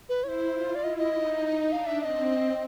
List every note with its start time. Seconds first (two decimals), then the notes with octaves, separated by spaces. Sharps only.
0.09 B4
0.23 E4 C#5
0.29 C5
0.53 F4
0.75 D5
0.83 E4 D#5
0.98 D#5
1.13 D#4
1.72 D4 F5
1.86 E5
2.01 C4 D#5 E5